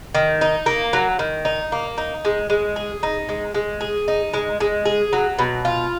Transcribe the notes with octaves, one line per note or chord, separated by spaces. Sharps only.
D#3
D#4
A#3
F#3
D#3
D#4
A#3
D#4
G#3
G#3
G#4
D#4
G#3
G#3
G#4
D#4
G#3
G#3
G#4
F#3
B2
F4